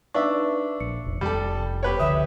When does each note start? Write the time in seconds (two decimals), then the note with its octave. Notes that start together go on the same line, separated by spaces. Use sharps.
0.14 D4 D#4 B4 E5 C#6
0.80 A#1 C#7
1.06 F1
1.21 F1 G3 A4
1.83 G4 B4 C#5
1.99 C#2 D3 F3 E5 D#6